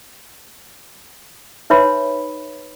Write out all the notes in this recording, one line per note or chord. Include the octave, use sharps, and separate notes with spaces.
D#4 B4 C#5 E5 B5 C6